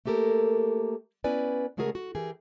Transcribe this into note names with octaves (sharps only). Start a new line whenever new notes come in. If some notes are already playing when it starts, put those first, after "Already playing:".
A3 A#3 G4 A4 A#4
B3 C#4 E4 B4 D5 G#5
C#3 G#3 A3 F#4 G#4 A#4
F#4
E3 G4 G#4 A#4